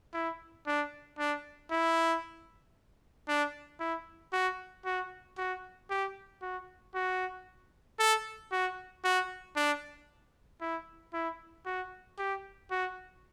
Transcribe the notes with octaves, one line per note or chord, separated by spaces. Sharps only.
E4
D4
D4
E4
D4
E4
F#4
F#4
F#4
G4
F#4
F#4
A4
F#4
F#4
D4
E4
E4
F#4
G4
F#4